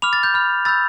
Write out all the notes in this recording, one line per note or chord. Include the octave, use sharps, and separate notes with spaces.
B5 D6 F6 F7
A6
G6
B5 F6
B5 E6 G6 A6